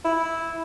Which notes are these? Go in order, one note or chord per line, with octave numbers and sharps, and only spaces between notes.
E4